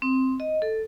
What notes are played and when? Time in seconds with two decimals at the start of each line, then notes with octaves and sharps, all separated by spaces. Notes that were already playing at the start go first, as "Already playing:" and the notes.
0.02 C4
0.40 D#5
0.62 A4